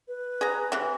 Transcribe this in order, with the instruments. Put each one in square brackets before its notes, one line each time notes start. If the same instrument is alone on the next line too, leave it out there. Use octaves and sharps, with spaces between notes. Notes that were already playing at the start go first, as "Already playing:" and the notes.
[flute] B4
[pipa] G#4 A#5
C3 E3